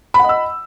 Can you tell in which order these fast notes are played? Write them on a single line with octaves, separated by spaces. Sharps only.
B5 F#5 D#5 E6